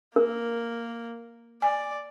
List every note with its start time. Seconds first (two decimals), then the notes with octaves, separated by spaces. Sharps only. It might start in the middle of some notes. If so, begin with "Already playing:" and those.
0.16 A#3 A#4
1.62 D5 G#5